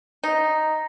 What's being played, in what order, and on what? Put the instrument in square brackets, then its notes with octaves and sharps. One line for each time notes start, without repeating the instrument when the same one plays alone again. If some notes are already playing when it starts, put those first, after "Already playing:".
[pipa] D#4